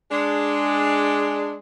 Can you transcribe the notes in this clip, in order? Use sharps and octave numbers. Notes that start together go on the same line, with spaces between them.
G#3 D4